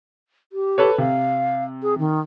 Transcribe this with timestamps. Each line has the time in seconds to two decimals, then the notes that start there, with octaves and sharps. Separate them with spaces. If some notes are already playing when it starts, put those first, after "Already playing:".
0.53 G4
0.78 A4 B4 C#5
0.98 C3 F5
1.83 G#4
1.99 D#3